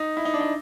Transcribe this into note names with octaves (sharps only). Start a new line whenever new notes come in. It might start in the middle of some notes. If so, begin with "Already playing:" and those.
Already playing: D#4
E4
D#4
D4
D#4